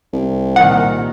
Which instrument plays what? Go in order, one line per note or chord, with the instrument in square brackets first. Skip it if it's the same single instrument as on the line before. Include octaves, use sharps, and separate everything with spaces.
[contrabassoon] C2
[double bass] A#2 D#3 [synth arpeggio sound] F#5